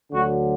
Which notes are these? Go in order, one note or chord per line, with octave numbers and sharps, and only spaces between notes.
D2 D3 F#3 F#4